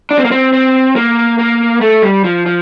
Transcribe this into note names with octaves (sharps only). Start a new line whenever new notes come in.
D4
C4
A#3
C4
C4
A#3
A#3
A3
G3
F3
F3